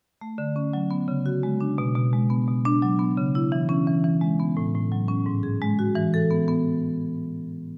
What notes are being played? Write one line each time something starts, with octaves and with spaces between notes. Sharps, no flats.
A3
D3
C#4
F#3
B3
C#3
F#4
G#3
D4
B2
B2
G#3
B3
B2
D4
F#3
B3
C#3
E4
E3
C#4
E3
E3
G#3
B3
A2
A2
F#3
C#4
G#2
G#4
G#3
F#4
E3
A4
B3
B3